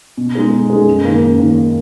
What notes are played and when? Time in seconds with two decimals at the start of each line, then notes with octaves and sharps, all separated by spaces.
0.17 B2
0.35 G#3 D#4 G#4
0.52 B2
0.70 G#3 D#4 G#4
0.87 F#2
1.05 D#3 A#3
1.22 F#2
1.39 D#3 A#3